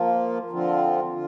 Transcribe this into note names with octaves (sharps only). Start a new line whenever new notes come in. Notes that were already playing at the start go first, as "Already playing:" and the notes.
Already playing: F3 A#3 F4
D3 F3 C4 F4
D3 F4